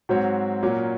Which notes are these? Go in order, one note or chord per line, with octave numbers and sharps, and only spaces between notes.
G#2 F#3 C4 F#4 C#5
A#2 F#3 A#3 C#4